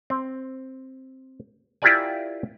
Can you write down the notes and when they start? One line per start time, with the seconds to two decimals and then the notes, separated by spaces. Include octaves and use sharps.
0.10 C4
1.82 E4 F4 G4 A#4 D5 G#5